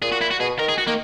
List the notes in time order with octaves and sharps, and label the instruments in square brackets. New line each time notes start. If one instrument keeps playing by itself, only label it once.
[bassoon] A#2 [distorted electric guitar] G#4
[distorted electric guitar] F#4
E4
F#4
[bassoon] B2 [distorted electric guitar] G#4
[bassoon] D#3 [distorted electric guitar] A#4
[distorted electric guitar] G#4
F#4
[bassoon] D#3 [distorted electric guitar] A#3